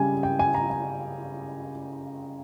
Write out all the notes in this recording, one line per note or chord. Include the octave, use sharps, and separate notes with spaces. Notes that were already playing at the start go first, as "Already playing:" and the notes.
Already playing: C#3 G3 G#5
G5
G#5
A#5
G#5